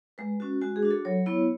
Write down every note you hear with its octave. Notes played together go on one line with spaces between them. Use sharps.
G#3 B4
C#4 F#4
G#3 F#4
G#4
D4 F#4
A4
F#3 C#5
B3 E4